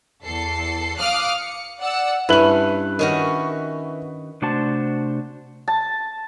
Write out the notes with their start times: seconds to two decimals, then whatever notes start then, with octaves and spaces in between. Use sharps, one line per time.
0.23 E2 A4 C7
0.98 F5 D6 D#6 F6 F#6
1.38 C#7
1.80 D5 F#5 E6
2.29 G2 C#4 E4 B4 F#7
2.99 D#3 C#4 F#4
4.42 C3 A3 D4 F#4 C5 A5
5.68 A5